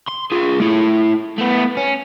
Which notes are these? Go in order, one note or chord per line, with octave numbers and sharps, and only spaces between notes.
C6
F4 G#4
A3 E4
A3 B3
C#4